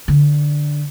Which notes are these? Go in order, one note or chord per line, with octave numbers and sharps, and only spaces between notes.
D3